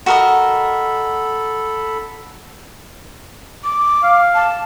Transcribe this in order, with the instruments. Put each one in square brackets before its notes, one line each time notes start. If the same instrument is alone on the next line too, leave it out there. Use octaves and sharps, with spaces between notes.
[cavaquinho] F#4 A#4 D#5 [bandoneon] A4 B5
[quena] D6
[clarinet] F5
[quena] A5